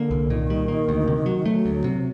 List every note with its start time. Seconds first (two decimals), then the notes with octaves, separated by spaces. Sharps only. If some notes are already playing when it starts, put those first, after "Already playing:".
Already playing: D3 A#3
0.11 C2
0.30 A#2 D#3
0.50 G3
0.68 A#3
0.89 D2
1.08 C3
1.26 F#3
1.46 F#3 A3
1.66 D2
1.84 C3